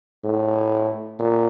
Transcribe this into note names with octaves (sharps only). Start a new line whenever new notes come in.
A2
A#2